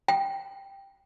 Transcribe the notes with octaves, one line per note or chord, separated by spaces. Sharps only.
G5